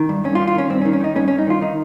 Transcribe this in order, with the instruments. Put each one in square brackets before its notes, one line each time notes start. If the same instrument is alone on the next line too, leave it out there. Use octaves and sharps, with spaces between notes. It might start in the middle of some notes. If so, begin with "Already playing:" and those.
Already playing: [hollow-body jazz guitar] D#3
G2
G2 C#4
F4
D#3
F4
D#3 C#4
G2 C4
C#4
D#3
C#4
D#3 D#4
G2 C#4
C#4
G2
D#4
D#3 F4
D#3 D#4